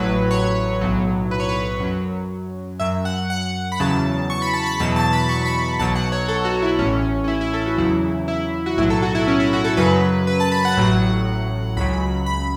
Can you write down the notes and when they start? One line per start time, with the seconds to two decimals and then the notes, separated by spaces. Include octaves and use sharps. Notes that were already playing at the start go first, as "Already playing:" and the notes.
Already playing: A1 A2 F#3 B4
0.31 C#5
0.81 B1 A2 F#3
1.31 B4
1.40 C#5
1.49 B4
1.80 F#2 F#3
2.80 F#2 F#3 E5
3.05 F#5
3.30 F#5
3.72 B5
3.80 E2 C#3 F#3 A5
4.30 C#6
4.42 B5
4.53 A5
4.66 B5
4.80 E2 B2 F#3 A5
4.96 A5
5.13 B5
5.29 C#6
5.46 B5
5.79 B1 B2 F#3 A5
5.95 F#5
6.12 C#5
6.28 A4
6.45 F#4
6.62 E4
6.79 A1 A2 E3 C#4
7.24 C#4
7.28 E4
7.41 E4
7.53 A4
7.66 F#4
7.78 E2 C#3 F#3 E4
8.28 E4
8.66 F#4
8.77 B1 A2 F#3 E4
8.90 A4
9.02 F#4
9.15 E4
9.28 C#4
9.40 E4
9.53 F#4
9.64 A4
9.77 F#2 C#3 F#3 B4
10.27 B4
10.40 A5
10.52 B5
10.65 F#5
10.77 A1 A2 F#3
11.77 C#2 C#3 F#3 B5
12.26 B5